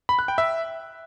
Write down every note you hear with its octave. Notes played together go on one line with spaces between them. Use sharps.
B5
F#6
G5
E5